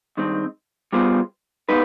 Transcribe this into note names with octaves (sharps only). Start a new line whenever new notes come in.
G2 D#3 G#3 C4
G3 B3 F4 G#4 C5
G#3 B3 D#4 B4